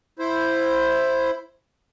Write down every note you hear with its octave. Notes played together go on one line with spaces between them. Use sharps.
E4 C5